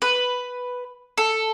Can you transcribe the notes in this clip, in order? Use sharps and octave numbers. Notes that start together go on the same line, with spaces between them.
B4
A4